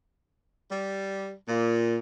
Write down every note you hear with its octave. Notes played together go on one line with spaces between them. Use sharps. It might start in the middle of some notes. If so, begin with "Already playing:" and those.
G3
A#2